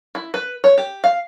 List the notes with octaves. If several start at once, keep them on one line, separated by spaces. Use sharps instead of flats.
E4
B4
C#5
G4
F5